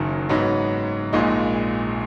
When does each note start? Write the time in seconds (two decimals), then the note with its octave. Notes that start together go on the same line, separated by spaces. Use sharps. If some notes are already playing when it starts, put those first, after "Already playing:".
Already playing: F#1 F#2 D#3 F#3 C#4
0.29 G#2 F#3 B3 D#4
1.13 A#1 A#2 G#3 D#4